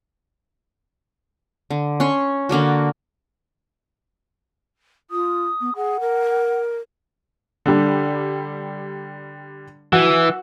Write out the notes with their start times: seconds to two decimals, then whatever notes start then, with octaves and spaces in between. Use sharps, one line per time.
1.70 D3
2.00 C#4 C6 C#6
2.49 D3 A#3 D4 F#4
5.11 F4 D#6
5.61 B3
5.75 G#4 F#5
6.00 A#4
7.66 D3 G3
9.93 E3 F#4